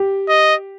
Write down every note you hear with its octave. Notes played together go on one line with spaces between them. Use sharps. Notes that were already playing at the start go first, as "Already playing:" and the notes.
Already playing: G4
D#5